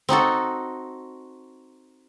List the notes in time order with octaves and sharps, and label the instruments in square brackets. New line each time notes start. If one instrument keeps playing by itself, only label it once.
[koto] C4 D#4 F#4 A4